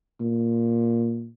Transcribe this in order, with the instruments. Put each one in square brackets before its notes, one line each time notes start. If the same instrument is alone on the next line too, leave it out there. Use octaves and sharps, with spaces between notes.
[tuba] A#2